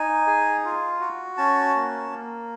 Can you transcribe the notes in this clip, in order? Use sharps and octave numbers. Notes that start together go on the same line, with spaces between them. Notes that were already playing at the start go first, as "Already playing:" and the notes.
Already playing: D#4 G#5
G#4
F4
F#4
C#4 A5
A#3
A#3